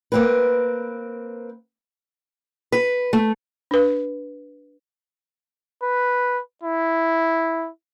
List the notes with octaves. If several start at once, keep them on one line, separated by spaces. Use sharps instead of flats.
A#3 C4 B4
B4
A3
D4 B4
B4
E4